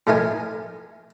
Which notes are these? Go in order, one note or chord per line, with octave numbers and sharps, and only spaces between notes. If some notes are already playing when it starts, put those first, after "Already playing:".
A2 F3 A3 D#4 A#4 G#5